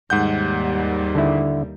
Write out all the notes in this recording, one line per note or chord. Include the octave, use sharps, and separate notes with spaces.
D#2 G#2 G3 F#5 G6
D3 E4